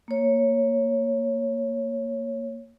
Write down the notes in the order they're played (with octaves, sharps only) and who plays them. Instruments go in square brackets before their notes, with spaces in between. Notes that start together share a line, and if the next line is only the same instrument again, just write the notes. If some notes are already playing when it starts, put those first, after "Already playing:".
[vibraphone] A#3 C#5